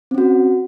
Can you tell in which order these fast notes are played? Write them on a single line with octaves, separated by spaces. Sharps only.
C4 C#4 F#4